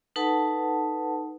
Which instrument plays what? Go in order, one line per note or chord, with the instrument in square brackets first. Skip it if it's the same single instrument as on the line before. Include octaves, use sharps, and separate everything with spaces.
[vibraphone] D#4 A4 B4 F#5 A5